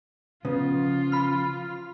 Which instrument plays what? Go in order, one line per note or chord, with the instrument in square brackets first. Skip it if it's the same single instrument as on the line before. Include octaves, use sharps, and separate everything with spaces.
[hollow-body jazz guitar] C#3 B3 [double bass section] F3 [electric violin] F4
[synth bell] B5 F6